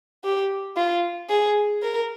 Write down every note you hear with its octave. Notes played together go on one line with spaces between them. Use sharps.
G4
F4
G#4
A#4